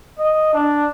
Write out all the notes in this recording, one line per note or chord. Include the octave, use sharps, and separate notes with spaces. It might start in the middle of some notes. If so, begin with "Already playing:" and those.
D#5
D4